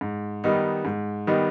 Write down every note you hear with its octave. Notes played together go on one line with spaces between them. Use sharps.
G#2
D#3 G3 B3 D#4
G#2
D#3 G3 B3 D#4